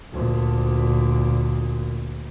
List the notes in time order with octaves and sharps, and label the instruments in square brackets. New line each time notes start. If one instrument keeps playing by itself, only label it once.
[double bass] D2 A#2